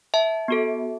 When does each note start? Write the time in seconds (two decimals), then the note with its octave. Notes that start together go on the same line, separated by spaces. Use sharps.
0.14 E5 A5
0.48 B3 F#4 A4